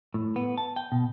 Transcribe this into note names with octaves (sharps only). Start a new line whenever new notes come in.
A2
B3
A5
G5
B2